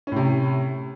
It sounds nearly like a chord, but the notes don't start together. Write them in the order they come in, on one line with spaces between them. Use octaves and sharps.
C#4 A2 C3